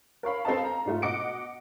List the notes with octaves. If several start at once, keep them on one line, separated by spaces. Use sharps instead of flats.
A#4 C#5 F5 B5
C4 A4 B4 D#5 F5 A5
A#5
G#2 A3 F4
B2 D#5 F#5 D6 C#7 D7